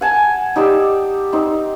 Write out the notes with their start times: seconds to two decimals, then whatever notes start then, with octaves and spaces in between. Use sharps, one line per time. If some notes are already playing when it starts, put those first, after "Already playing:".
0.01 F#5 G#5 A5
0.56 D#4 G4 D5 E6
1.32 C4 D#4